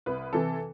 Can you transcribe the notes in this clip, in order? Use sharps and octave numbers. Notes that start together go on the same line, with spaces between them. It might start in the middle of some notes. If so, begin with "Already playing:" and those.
C2 B4
C3 E3 A4